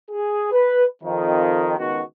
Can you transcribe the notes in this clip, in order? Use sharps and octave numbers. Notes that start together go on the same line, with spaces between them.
G#4
B4
F2 D#3
C#2 D#3 B3 F#4